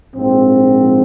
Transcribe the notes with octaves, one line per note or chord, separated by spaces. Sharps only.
A#1 G#2 F3 C4